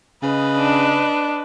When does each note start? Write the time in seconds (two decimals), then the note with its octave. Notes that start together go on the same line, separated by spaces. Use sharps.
0.23 C#3 B4 D#5
0.58 D4